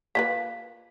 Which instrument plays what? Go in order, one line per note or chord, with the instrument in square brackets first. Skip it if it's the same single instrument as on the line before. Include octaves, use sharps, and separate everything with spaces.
[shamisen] A#3 F4 B4 [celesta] B6